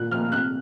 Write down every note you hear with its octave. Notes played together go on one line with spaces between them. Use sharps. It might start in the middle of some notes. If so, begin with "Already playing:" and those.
Already playing: A#2 F#6
F3 A#3 F6
C3 F#6